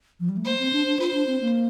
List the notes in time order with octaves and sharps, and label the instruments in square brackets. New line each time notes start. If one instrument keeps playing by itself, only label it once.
[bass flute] F3
G3
A3
[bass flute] A#3 [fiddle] C5
[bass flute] C4
D4
D4
[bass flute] F4 [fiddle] C5
[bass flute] D4
C4
A#3